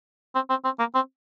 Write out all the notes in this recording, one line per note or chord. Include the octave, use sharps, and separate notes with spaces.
C4
C4
C4
A#3
C4